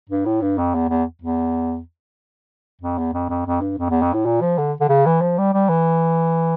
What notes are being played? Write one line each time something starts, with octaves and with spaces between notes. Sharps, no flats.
G2
A2
G2
F2
E2
E2
E2
F2
E2
F2
F2
F2
G2
F2
E2
F2
A2
A#2
F3
D3
D3
C#3
E3
F3
G3
G3
E3